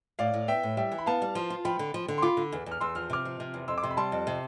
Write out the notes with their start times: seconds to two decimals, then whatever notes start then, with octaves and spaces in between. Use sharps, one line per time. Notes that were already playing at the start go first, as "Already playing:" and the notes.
0.19 A2 D5 F5
0.34 A2
0.48 B3 E5 G5
0.63 A2
0.77 G3 E5 G5
0.92 E3
0.98 B5
1.06 B3 F5 A5
1.22 G3
1.35 F3
1.50 F4
1.65 F3 G5 B5
1.79 D3
1.94 F3
2.08 D3
2.18 C6
2.22 F4 B5 D6
2.37 D3
2.52 E2
2.66 E2
2.72 F6
2.81 E2 C6 E6
2.95 F3 F6
3.10 C3 D6 F6
3.25 F3
3.40 C3
3.54 E2
3.68 F2 C6 E6
3.78 D6
3.83 C3 C6 E6
3.91 B5
3.97 G3 A5 C6
4.12 F2
4.27 C3